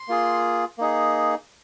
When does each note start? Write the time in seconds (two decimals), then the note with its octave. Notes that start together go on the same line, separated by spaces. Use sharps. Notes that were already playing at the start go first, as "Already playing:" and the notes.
Already playing: C6
0.08 A#3 F4 G#4
0.78 A#3 D#4 G#4